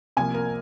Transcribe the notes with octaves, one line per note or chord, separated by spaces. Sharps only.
C2 C3 F3 A#3 G#5
A#4